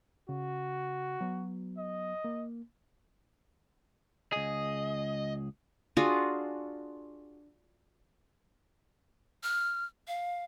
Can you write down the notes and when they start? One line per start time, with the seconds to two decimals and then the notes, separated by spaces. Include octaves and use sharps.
0.29 C#3 F#4
1.21 F#3 B3
1.78 D#5
2.24 A#3
4.32 C#2 G#4 D#5
5.97 D4 F4 F#4 G#4
9.43 F6
10.07 F5